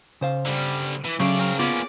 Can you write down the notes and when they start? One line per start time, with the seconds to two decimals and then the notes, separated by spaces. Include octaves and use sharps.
0.21 C#3 C5 F5
0.45 D3 G3
1.04 E3
1.20 C#3 F#3 A3 D5
1.39 C4 A#4
1.59 A#3 B3 C#4 F4 D5